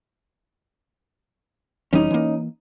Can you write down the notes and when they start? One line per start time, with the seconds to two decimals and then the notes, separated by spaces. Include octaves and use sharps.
1.93 F1 E3 G3 C#4 D#4
2.11 E3 A#3